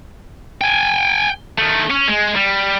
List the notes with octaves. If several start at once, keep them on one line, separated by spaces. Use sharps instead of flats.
G5 G#5
D#3 A3
C#4
G#3
G3